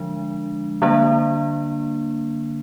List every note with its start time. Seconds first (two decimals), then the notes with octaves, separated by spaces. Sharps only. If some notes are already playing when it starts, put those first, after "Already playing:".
Already playing: D3 F3 G#3 D4
0.82 D3 G3 A#3 D4